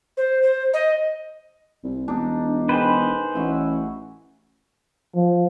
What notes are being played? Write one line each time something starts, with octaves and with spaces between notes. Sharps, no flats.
C5
C5
D#5
C2
E1 D4 D#4
D#3 G#4 B4 C5
A1 E4 F#4
F3